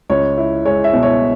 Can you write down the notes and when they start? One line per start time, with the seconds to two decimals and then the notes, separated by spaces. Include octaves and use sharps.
0.10 C#2 C#5
0.37 E4
0.65 G#3 C#5
0.84 E5
0.93 B2
1.03 C#5